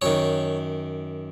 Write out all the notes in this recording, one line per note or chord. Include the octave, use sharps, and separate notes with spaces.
F#2 D#3 C#5